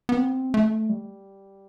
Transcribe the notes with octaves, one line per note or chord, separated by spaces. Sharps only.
B3
C4
A3
G3